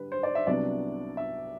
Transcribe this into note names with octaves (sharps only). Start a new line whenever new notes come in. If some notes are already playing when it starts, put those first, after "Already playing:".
Already playing: D3 G3 B4
C5
D5
E5
C2 C3 F#3 B3 D4 D5
E5